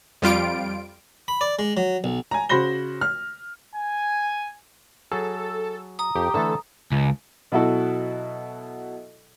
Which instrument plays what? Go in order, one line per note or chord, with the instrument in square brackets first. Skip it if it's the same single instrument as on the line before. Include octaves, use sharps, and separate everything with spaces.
[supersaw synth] F2 G3 F4 D7
[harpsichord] B5
D5
G#3
F#3
B1
[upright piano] G#5 A#5
C#3 F#4 C5 B5 A#6 G7
F6
[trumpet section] G#5
[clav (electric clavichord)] F#3 G#4 [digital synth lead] A4
[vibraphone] A#5 D#6
[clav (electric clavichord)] F2 [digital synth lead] G4
[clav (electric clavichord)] D3 E3 A3 [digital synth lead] A4
[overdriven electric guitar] C#2
[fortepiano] B2 F#3 E4 F#4 A4